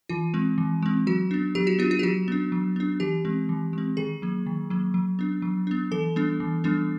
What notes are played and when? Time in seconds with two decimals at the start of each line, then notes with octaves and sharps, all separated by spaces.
0.09 E3 F4
0.34 G#3 C4
0.58 E3
0.82 G#3 C4
1.07 F#3 F#4
1.31 B3 D4
1.55 F#3 G4
1.67 F#4
1.79 B3 F4
1.82 D4
1.91 F4
1.99 G4
2.03 F#3 F#4
2.28 B3 D4
2.52 F#3
2.76 B3 D4
3.00 E3 G4
3.25 G#3 C4
3.49 E3
3.73 G#3 C4
3.97 D#3 G#4
4.22 F#3 A#3
4.46 D#3
4.70 F#3 A#3
4.94 F#3
5.19 B3 D4
5.42 F#3
5.67 B3 D4
5.91 E3 A4
6.16 G3 B3 D4
6.40 E3
6.64 G3 B3 D4